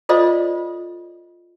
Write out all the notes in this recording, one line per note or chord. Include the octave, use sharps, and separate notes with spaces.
F4 A4 C5 D5 D#5 F5